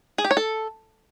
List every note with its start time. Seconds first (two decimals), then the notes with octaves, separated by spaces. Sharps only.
0.18 G#4
0.25 G4
0.31 C#5
0.37 A4